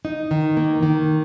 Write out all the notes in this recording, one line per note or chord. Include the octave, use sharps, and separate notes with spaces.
D#4
D#3
A#3
D#3